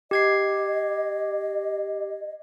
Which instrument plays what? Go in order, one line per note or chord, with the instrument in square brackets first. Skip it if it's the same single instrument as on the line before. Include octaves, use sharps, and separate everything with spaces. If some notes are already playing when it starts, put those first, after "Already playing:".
[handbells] G4 G#6 C7 [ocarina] D#5